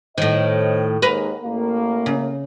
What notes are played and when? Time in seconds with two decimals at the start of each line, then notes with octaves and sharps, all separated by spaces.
0.18 A2 D#3 C5 C#5 D#5
1.02 D#2 G#2 A#4 B4
1.43 A1 A2 A#3
2.06 C#3